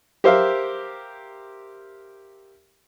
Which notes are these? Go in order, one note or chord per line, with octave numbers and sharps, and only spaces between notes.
G4 A#4 C5 E5 F5